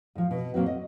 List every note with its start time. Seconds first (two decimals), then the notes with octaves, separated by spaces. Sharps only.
0.15 G#2 F3
0.31 B2
0.54 A#2 F#3 A#3 C4 F#4
0.66 D#5